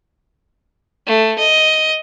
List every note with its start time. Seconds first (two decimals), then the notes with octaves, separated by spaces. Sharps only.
1.07 A3
1.38 D#5